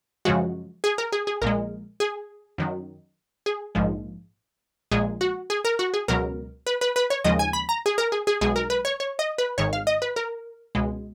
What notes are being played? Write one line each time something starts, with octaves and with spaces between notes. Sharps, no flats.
F#2 C#3 F3 G#3 F#4
G#4
A#4
G#4
G#4
A#1 A#2 G#3 A#4
G#4
F#2 D#3 F#3
G#4
A#1 G#2 F3 G#3
A#1 A#2 G#3 G#4
F#4
G#4
A#4
F#4
G#4
C#2 B2 F#3 A#4
B4
B4
B4
C#5
D#2 C#3 F3 G#3 D#5
G#5
B5
A#5
G#4
A#4
G#4
G#4
B1 B2 G#3 G#4
A#4
B4
C#5
C#5
D#5
B4
G#1 G#2 D#3 C#5
F5
D#5
B4
A#4
C#2 B2 G#3